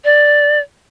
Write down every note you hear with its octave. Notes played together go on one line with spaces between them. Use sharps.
D5